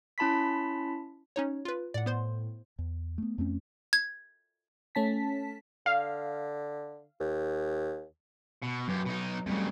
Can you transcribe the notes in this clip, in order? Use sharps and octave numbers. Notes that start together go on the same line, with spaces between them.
C#4 E4 A5 B5 C6 B6
C#4 D#4 C#5
F4 B4
A2 D5 F#5
B3 C5 C6
E2
A3 B3
F2 A3 C4 C#4
G#6
A3 C#4 A5 B6
D3 F5
D#2
B2
F#2 F#3 G4 B4
B2 D#4
F2 C#3 G3 A3